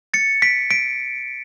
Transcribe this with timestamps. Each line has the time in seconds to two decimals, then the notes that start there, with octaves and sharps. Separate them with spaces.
0.14 A6 C#7
0.42 B6 D7
0.71 B6 D7